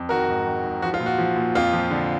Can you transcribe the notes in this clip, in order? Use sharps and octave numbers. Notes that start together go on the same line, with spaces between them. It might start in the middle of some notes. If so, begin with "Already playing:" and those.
Already playing: F2
D#3 F#4 A#4
G#2
D#3
G#2
F3 F#4
F4
A#2
F#4
F3
A#2
F2 F4
F3
D3